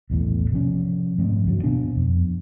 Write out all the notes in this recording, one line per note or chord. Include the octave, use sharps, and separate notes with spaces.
B1 E2 A2
C3 F3 C#4
G#2 F3 A3 C4
C#2 G2 D3 F#3
B2 B3 D4
F2